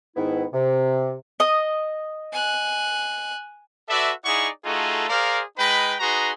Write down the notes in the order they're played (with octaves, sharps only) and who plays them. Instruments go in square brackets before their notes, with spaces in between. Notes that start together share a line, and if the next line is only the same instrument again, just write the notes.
[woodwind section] G#2 D#3 B3 E4
C3
[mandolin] D#5 D#6
[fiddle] G#5 F#6
[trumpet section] F#4 A4 B4 D5 E5
D#4 E4 G#4 D5 F#5 C#6
A3 D#4 F4 F#4 G#4 A4
G#4 A#4 C5 D5 F5
G#3 D#4 B4 G5 B5
D#4 F#4 G#4 B4 A#5 C6